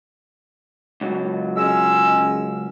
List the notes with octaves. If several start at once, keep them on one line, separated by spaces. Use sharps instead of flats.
C#2 F#3
G#3 C#4 E6